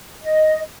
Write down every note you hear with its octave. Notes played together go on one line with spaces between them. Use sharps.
D#5